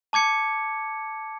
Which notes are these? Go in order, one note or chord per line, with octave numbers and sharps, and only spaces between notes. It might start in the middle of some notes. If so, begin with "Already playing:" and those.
A5 D6 G#6 C#7